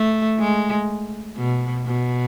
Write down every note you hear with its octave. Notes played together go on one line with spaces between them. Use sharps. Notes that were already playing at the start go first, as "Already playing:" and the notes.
Already playing: A3
G#3
B2
B2